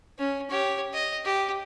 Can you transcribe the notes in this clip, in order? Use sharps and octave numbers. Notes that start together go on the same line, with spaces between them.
C#4
G4 C#5
D#5
G4